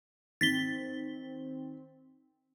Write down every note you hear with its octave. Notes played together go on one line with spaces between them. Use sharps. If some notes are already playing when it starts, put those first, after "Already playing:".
D#3 C4 A6 B6 G7